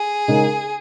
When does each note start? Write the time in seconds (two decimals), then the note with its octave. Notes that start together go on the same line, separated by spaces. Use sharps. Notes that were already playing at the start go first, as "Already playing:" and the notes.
Already playing: G#4
0.28 C#3 G#3 D#4 A#4